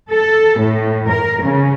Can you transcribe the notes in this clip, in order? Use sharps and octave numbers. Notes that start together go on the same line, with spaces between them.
A4
A2
A#4
C#3